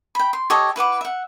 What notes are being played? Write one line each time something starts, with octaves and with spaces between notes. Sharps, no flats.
G5 B5
C6
G4 A4 C#5 D#5
E4 B4 F#5 D6
E5 F#5